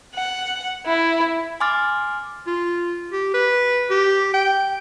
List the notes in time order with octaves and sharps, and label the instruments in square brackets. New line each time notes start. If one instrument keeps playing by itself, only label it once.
[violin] F#5
E4
[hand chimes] G#5 C6 D6 F6 A6
[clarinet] F4
G4
B4
G4
G5